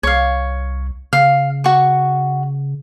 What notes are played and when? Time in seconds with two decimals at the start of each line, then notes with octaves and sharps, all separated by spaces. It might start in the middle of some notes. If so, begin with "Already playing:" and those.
0.03 C2 C#5 F5
1.13 C#3 F5
1.64 F#4 C#6